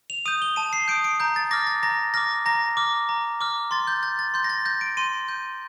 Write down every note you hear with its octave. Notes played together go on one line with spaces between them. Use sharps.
F7
D#6 G6 D#7
G7
A5 D#7
C7
D#6 G6 D7
D7
A#5 G6
A6
D6 F6 A#6
A6
A#5 A#6
D6 F6 A#6
A#5 A#6
D6 F6
A#5
D6 F6
C6 A6
G6
G6 A6
A6
C6 G6
A#6
A6
G6 A#6
D7
C6 D#7
G6